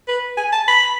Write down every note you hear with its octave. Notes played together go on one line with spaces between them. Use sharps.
B4
G#5
A5
B5